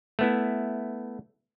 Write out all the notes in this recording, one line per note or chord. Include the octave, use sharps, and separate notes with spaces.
A3 B3 E4